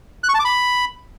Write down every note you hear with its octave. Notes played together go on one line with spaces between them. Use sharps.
F#6
C#6
A5
D6
B5